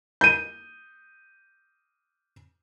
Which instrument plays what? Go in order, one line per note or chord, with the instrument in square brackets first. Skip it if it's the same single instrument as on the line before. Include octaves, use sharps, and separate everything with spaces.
[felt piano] G6 D#7